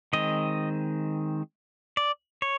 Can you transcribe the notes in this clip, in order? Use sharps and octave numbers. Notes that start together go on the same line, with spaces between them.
D#3 G#3 C4 D#5
D5
C#5